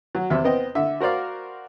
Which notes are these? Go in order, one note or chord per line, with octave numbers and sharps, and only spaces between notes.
F#3
E2 C3 C4 E5
B3 C4 D#5 G5
D3 E5
F#4 A#4 C5 D5 F5